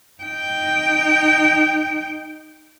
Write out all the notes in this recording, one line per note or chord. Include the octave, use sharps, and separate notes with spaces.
D#4 G5